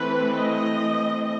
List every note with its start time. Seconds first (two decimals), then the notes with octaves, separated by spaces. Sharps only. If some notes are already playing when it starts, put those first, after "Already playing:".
Already playing: E3 A3 C4 B4
0.35 D#5